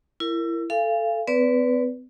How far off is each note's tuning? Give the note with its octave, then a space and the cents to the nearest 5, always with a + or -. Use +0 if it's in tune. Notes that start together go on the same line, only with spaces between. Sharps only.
E4 +25 A#4 -10
A4 +0 F5 -30 G#5 -20
C4 -45 B4 +0 D5 -25